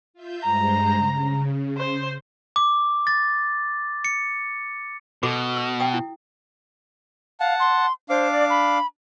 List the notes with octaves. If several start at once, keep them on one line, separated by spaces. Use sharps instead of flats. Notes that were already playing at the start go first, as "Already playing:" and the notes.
F4 E5 G6
G2 G#3 C5 A#5
C#3
C5
D6
A6
C#7
B2 F#4 A4 D6
E6
G5 D#6
E4
F5 F#5 A5
C6
D4 C5 F5 D6
D5
B5